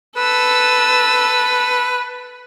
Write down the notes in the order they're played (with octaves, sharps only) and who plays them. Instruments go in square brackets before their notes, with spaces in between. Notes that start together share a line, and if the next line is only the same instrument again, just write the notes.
[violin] A4 E6 [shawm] B4